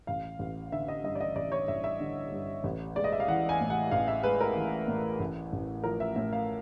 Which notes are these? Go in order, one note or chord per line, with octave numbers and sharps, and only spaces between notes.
A1 F5
A1
D3 E5
D#5
G2 D#5
D5
D#5
A1 D5
C#5
A1 E5
E5
D3
G2
A1
G#3 D5
D#5
E5
F5
E3 F#5
G#5
A2
F#5
A1 F5
E5
G#3 B4
A#4
E3
A2
A1
A1
F3 A#4
E5
A2 E5
F5